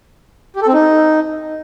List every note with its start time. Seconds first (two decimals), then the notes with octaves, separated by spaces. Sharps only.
0.56 G4
0.62 A4
0.67 C4
0.73 D#4